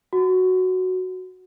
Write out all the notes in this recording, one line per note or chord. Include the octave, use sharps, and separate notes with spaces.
F#4